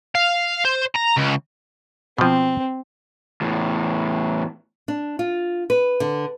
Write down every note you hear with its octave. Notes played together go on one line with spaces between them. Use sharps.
F5
C5
A#5
C#2
B2 F3 C4
E2 A2
D4
F4
B4
D3